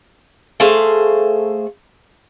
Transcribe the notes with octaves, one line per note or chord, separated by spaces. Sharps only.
A3 G#4 C5 F5